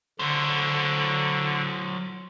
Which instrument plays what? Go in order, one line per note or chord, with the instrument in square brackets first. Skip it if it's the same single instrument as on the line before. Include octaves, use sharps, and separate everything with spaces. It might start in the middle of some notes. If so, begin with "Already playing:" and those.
[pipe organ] D3 [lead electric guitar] F#3 C5